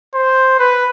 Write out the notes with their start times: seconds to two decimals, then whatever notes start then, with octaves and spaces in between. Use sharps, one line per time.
0.14 C5
0.59 B4